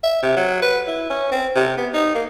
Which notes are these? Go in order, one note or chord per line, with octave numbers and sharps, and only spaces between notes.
E5
C3
F#3
B4
E4
C#4
C4
C3
B3
D#4
A#3